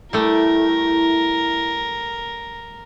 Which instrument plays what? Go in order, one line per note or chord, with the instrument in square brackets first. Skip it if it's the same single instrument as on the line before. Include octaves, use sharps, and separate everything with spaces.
[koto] G3 A3 [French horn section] E4 [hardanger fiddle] A#4